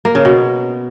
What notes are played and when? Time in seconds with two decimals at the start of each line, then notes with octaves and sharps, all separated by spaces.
0.05 A#3
0.15 C#3
0.25 B2